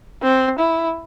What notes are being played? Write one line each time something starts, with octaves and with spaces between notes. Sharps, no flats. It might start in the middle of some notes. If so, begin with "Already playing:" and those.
C4
E4